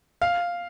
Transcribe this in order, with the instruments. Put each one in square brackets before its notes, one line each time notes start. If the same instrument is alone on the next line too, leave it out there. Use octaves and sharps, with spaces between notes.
[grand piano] F5